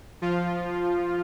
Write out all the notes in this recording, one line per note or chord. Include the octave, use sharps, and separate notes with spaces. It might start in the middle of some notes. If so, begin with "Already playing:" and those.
F3 F4